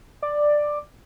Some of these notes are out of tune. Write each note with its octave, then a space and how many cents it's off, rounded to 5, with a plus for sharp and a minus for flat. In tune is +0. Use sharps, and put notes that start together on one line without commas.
D5 +10